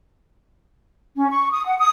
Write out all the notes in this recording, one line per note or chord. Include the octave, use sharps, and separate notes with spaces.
C#4
C#6
D#6
F#5
D#6